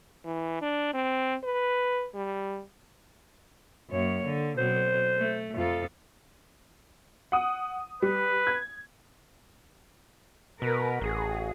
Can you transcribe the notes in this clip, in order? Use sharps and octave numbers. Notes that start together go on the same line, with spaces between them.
E3
D4
C4
B4
G3
F#2 A#3 C#5
D3
B2 F#3 C4 C5
A3
F2 F4 A4
F#5 D#6
G3 B4
G#6
B2 A#4 B4
A1 F#4 G#4